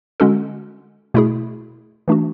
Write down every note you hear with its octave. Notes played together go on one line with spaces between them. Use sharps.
D3 G#3 C#4 F#4 A4
B2 A3 E4 G#4
E3 A3 D4 F#4